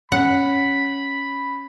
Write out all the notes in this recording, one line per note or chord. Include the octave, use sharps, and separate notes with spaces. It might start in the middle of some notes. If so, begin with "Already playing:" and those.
C#4 F#5 B5